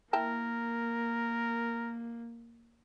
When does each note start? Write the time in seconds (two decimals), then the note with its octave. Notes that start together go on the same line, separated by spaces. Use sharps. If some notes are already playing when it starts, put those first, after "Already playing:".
0.13 A#3 E4 A#4 G5 A5